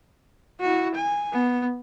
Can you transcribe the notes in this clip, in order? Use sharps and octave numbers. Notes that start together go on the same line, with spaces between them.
E4 F#4
G#5
B3